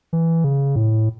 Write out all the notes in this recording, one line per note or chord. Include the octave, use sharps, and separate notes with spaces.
E3
C#3
A2